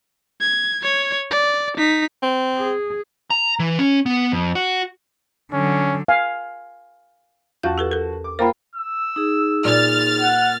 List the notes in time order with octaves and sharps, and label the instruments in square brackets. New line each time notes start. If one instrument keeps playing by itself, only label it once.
[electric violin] G#6
C#5 G#6
D5
D#4 B6
[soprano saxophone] C4
[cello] G#4
[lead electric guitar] A#5
E3
C#4
B3
F2
F#4
[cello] D3 F#3 [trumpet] C#4
[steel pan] F5 G#5
[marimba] E2 G6 [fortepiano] F3 F#4 A5
[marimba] G4 A4 B4
A4 A#4
[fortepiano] D6
[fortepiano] A#3 F4 F5 [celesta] A#4 G5 B5 [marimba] C5
[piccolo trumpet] E6
[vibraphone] D#4 G#4
[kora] A#2 [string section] F6 A6
[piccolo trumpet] F#5